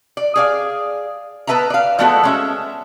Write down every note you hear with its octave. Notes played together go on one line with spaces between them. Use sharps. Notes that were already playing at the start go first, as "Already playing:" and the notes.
D5
G#4 D5 F5
B3 A#4 B4 E5 A5 A#5
D5 F5
F3 G#3 A3 B3 F#4 A4
G#3 C#4 E5